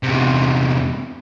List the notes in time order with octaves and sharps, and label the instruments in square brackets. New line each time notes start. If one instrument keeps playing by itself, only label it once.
[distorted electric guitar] E2 C3